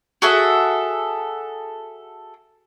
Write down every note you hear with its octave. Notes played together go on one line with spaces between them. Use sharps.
F#4 G#4 A4 E5